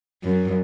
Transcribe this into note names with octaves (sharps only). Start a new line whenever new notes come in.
F#2